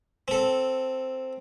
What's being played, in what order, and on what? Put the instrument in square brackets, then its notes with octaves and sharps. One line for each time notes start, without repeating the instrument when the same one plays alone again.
[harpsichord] C4 A4